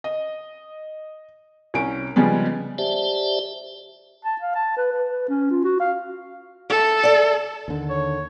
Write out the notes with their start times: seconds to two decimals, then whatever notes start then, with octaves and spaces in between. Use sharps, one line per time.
0.04 D#5
1.74 C2 C#4 D7
2.16 C#3 F3 G3 G#3 B3
2.78 G4 C5 D5 E5 A5
4.25 A5
4.41 F5
4.55 A5
4.77 B4
4.92 B4
5.09 B4
5.29 C#4
5.51 F4
5.64 F#4
5.80 F5
6.70 A4 E5
7.03 D5 E5
7.68 D#2 D3
7.90 C#5